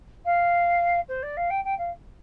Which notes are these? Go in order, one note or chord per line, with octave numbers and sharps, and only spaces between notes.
F5
C5
D5
F5
G5
G5
F5